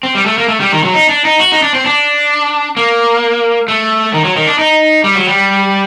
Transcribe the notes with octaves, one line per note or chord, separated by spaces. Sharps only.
C4
G3
A3
A#3
A3
G3
D#3
F#3
D#4
D4
D#4
F#4
D#4
D4
C4
D4
A#3
A3
D#3
F#3
D#3
D4
D#4
G3
F#3
G3